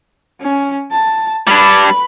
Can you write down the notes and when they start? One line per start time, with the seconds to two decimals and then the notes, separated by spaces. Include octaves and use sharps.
0.41 C#4 G#5
0.92 A5
1.47 G3 D4 B4 B5